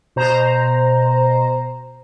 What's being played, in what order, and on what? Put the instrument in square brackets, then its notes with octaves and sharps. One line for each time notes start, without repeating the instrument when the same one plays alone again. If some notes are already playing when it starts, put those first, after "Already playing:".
[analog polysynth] B2 C5 A#5